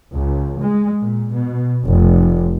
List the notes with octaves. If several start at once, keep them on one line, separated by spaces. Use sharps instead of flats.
C#2
G#3
A#2
B2
F1